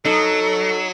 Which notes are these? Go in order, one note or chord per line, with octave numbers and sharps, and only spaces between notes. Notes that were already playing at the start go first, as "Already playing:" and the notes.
F#3 D#4 A4